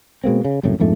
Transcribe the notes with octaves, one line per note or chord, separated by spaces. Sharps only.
B2 G#3 A#3 C4
C#3
F#1 C2 F#2 A2
A#1 F2 G#2 A3